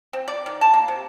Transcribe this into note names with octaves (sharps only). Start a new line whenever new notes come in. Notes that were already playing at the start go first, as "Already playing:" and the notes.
C4
D5
D#3
A5
A#3
C3